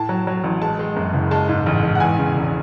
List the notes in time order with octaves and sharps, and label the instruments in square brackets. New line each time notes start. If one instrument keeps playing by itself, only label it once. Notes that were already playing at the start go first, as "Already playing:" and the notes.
Already playing: [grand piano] A2 A5
F#3
F#3
A1
G#3 A5
G#3
F#2
F#1
G#3 A5
G#2
A1
G#3
F#5
E2 G#5
C#3
E1